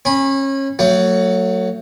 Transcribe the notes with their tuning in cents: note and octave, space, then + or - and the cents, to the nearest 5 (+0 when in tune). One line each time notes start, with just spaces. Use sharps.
C#4 -30 B5 +0
F#3 +0 A3 +35